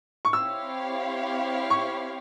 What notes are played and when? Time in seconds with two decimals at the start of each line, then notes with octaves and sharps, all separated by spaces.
0.25 C#6
0.33 C4 E4 G4 C#5 F5 E6
1.70 C#6